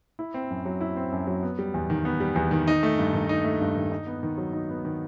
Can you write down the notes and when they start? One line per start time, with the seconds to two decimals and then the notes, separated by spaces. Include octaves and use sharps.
0.19 E4
0.34 C4
0.50 F#2
0.65 F#3
0.81 E4
0.96 C4
1.12 F#2
1.27 F#3
1.43 B3
1.59 G3
1.74 E2
1.90 D#3
2.05 B3
2.20 G3
2.36 E2
2.51 D#3
2.67 D#4
2.83 A3
2.99 G2
3.13 D#3
3.29 D#4
3.44 A3
3.61 G2
3.76 D#3
3.92 D#4
4.07 B3
4.23 D#3
4.38 F#3
4.53 D#4
4.69 B3
4.85 D#3